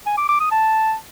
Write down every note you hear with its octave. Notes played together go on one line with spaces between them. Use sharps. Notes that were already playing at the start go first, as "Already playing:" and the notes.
G#5
D6
D6
D#6
A5